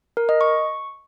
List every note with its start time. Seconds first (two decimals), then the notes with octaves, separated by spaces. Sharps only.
0.17 A#4
0.29 D#5
0.41 C#6